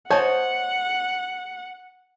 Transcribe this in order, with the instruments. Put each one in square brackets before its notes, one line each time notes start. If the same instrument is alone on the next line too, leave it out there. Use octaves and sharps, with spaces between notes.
[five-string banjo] C5 A5 [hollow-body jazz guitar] C#5 D#5 [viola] F#5